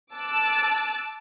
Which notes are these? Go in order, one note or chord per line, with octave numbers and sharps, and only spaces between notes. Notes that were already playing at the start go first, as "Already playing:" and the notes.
A5 D6 E6 F#6 A6